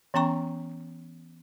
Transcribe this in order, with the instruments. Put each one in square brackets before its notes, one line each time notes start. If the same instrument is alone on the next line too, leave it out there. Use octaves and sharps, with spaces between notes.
[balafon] E3 B3 C#4 G5 A#5 C#6